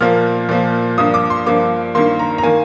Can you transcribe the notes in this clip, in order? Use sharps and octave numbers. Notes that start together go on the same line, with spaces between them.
A#2 F3 A#3 F6
A#2 F3 A#3
G2 F3 A#3 D#6
D6
C6
G2 F3 A#3 D6
G2 D#3 A#3 C6
A#5
A#5
D#3 A#3 G#5